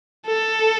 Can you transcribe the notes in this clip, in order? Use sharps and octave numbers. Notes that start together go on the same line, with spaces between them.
A4